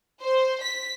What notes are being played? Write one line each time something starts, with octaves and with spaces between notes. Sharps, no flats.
C5
B6